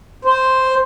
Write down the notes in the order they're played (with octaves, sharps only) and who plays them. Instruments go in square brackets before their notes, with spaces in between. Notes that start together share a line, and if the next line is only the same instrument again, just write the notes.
[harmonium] C5